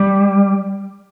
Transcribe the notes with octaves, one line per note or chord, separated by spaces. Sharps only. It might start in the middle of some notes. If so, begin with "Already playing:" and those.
Already playing: G3